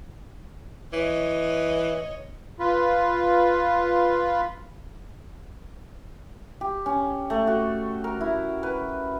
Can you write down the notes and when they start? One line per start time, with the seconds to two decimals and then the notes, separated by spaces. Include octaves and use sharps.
0.93 E3 C#5 D#5
2.59 F4 B4
6.61 G4
6.86 C#4
7.30 A3
7.47 F#4
8.04 A#4
8.21 E4
8.63 B4